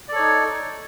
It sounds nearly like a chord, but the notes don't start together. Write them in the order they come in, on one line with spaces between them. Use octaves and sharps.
D5 A4 C#5 D#4